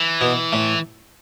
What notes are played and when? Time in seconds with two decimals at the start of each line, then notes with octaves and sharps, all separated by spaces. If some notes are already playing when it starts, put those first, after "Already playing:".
Already playing: E3
0.21 B2 B3
0.52 A2 A3